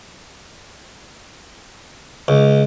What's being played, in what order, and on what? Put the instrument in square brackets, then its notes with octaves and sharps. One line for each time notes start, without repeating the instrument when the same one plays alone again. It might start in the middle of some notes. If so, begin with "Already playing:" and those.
[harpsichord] C#2